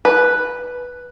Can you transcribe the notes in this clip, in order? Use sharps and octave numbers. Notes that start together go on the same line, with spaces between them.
B4